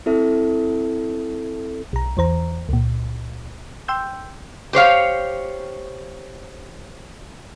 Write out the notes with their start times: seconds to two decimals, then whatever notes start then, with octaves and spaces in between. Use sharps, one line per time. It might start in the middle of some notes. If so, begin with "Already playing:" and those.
0.06 C4 E4 A4 E5
1.93 B1 A#5
2.17 E2 E3 C5 A#5
2.69 C#2 A#2
3.88 G5 C6 E6 G6
4.73 G4 C5 C#5 F5